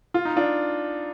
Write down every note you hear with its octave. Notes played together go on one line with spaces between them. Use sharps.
F4
D#4
D4 F4